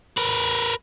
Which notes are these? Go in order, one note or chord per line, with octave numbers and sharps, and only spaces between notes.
A#4 B4